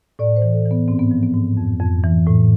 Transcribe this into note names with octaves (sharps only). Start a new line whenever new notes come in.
A2 D5
C5
E3
A4
E3
B3
G#2 C4
B3
F3
B3
G#2
F2
F2
E3
A2